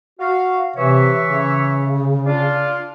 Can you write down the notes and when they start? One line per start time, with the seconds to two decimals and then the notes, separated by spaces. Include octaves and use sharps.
0.20 F#4 F5
0.76 C3 E3 C#5 E5
1.25 C#3
2.26 D4 F4